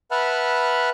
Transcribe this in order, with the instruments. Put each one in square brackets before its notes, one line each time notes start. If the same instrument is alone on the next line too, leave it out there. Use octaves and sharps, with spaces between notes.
[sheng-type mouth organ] B4 E5 F#5 A5 B5 F6